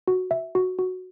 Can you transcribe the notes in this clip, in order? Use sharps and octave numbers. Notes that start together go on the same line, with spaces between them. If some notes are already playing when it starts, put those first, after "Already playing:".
F#4
E5
F#4
F#4